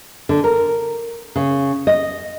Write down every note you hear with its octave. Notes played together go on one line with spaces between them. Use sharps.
D3
A#4
C#3
D#5